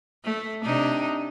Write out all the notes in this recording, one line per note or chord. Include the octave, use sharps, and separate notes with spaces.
A3
C3 D4 D#4